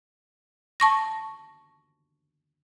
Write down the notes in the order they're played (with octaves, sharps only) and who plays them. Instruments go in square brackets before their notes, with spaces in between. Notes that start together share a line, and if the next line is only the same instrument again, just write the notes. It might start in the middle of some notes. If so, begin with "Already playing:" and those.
[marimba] A5 C#6 A#6